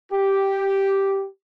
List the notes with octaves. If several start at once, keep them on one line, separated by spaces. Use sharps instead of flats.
G4